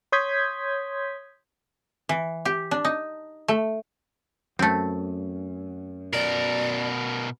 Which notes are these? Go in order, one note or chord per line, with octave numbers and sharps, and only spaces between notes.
C#5 C6 D#6 G6 G#6 B6
E3
G4
D4
D#4
A3
F#2 A3 C4
B2 A#4 D5